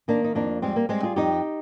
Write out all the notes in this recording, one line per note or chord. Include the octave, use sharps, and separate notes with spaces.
D#3 A#3 D4
D#4
F2 A#3 D4
G3 G#3 C4
A#3
G3 G#3 C4
F4 G#4
F2 D#4 G4